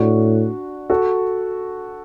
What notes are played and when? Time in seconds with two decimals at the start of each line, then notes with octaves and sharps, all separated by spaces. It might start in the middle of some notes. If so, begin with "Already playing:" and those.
Already playing: A2 D4 F#4
0.90 F#4 A4